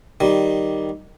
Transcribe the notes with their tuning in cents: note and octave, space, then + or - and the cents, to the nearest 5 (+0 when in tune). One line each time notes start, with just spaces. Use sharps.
D#3 -5 G3 -10